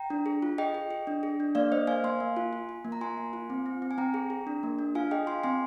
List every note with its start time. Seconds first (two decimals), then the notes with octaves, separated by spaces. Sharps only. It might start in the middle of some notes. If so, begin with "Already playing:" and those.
Already playing: G5 A#5
0.10 D4
0.26 G#4
0.42 F4
0.58 G#4 D#5 G5
0.74 G#4
0.91 G#4
1.07 D4
1.23 G#4
1.40 D4
1.55 A#3 D5 F5
1.72 A#3 C5 D#5
1.87 A#3 F5 G#5
2.04 A#3 G#5 C6
2.20 A#3
2.36 F4
2.53 F4
2.69 F4
2.85 A#3
2.92 A#5
3.01 F4 G#5 C6
3.17 A#3
3.33 F4
3.50 C4
3.66 C4
3.82 C4
3.91 G#5
3.98 C4 G5 A#5
4.14 G#4
4.30 G#4
4.47 D4
4.63 A#3
4.79 D4
4.95 F4 F5 G#5
5.11 G#4 D#5 G5
5.27 F4 G#5 C6
5.43 C4 G#5 C6